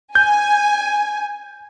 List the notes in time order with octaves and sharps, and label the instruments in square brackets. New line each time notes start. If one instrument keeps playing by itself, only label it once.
[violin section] G#5 [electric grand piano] G6